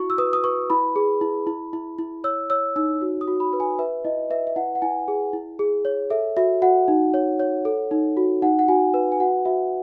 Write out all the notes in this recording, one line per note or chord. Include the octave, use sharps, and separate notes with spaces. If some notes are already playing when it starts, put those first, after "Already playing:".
Already playing: E4 F#4 C#6
E6
B4 D#6
D#6
B4 C#6
E4 B5
G#4
E4
E4
E4
E4
C#5 E6
C#5 E6
D#4 E6
F#4
D#6
F#4
B5
B4
G#5
B4 E5
E4 D#5
B4 E5
E5
E4 F#5
F#5
E4 G#5
G#4
E4
G#4
C#5
A4 E5
F#4 E5
F#4 F#5
D#4
C#5
C#5
A4
D#4
F#4
D#4 F#5
F#5
F#4 G#5
B4
G#5
F#4 F#5
F#4 E5